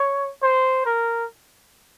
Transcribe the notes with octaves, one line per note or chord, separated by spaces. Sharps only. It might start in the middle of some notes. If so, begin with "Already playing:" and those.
Already playing: C#5
C5
A#4